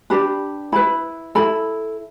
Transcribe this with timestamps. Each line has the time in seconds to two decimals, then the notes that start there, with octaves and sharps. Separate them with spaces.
0.10 D4 G4 B4 B5
0.72 E4 B4 B5
1.35 E4 A4 B5